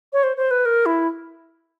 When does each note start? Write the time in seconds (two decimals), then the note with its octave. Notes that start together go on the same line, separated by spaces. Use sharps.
0.13 C#5
0.23 C5
0.37 C5
0.51 B4
0.66 A#4
0.86 E4